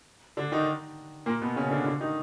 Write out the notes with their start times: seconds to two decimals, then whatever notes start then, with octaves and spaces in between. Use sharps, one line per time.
0.37 D3 D4
0.52 D#3 D#4
1.26 A#2 A#3
1.42 B2 B3
1.56 C#3 C#4
1.71 D3 D4
1.86 D3 D4
2.01 D#3 D#4